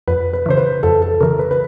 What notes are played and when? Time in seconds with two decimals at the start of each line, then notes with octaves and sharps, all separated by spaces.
0.08 F2 B4
0.33 B4
0.46 C#3 E3 C5
0.57 B4
0.83 F2 A4
1.02 A4
1.21 C#3 E3 A#4
1.39 B4
1.51 B4